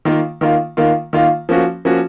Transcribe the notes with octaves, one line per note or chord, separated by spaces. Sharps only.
D#3 A#3 F4
D#3 A#3 F4
D#3 A#3 F4
D#3 A#3 F4
F3 A#3 C#4 F#4
F3 A#3 C#4 F#4